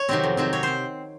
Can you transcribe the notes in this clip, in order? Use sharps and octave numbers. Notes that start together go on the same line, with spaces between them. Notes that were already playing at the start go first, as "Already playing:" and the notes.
Already playing: C#5
C3 D#3 F#3 C4
F2
C3 D#3 F#3 C4
C3 C#5
C4 C5